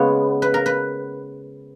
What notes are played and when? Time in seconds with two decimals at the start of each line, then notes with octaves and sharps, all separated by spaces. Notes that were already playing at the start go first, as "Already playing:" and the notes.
Already playing: C#3 G#3 B3 C#5
0.42 B4
0.54 A#4
0.66 B4